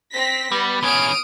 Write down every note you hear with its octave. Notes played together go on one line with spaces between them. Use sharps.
C4 A#6 B6
G3 B3
E3 C#4 D#6 F6 D7